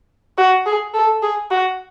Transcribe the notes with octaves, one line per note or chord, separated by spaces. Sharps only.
F#4
G#4
A4
G#4
F#4